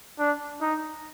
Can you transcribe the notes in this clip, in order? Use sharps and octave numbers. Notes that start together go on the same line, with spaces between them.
D4
D#4